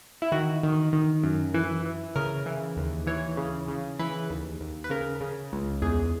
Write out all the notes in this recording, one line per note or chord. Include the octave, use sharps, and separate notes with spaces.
E4
D#3 F#4
D#3
D#3
F#2
E3
E3
C#3 A#4
E3
D#2
E3 C#5
C#3
C#3
E3 B4
D#2
D#2
B4
C#3 A#4
C#3
C#2
E2 G#4